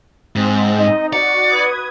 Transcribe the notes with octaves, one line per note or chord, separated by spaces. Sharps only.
G#2 C4
D#4 D#5
F#4 D5 C#7
B4 D#6 G#6